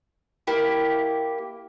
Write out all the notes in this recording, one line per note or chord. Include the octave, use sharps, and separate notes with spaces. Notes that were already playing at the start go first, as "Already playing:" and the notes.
A#3 E4 G4